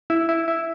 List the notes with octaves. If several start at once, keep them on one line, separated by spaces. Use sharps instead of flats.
E4
E4
E4